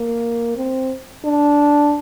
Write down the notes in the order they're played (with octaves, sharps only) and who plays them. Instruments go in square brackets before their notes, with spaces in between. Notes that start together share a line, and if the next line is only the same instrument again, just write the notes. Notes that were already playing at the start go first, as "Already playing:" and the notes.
Already playing: [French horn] A#3
C4
D4